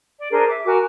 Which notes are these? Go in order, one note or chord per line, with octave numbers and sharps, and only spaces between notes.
D5
D4 G#4 A#4 C5
E5 D6
F#4 A#4 G#5 D6